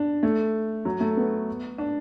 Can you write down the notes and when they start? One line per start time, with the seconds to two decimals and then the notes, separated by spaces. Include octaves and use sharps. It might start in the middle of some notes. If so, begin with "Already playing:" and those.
Already playing: D4
0.23 A3
0.85 F#3
1.00 A3
1.17 B3
1.78 D4